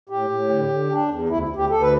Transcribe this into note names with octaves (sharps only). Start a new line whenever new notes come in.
A2 G4
A2
D3
D3
D4
E2
D2 E4
D2
G4
D2 A4
B4